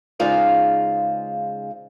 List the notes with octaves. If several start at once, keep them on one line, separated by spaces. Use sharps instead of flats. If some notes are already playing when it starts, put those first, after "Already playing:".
C#3 G#3 D#4 F4 C5 D5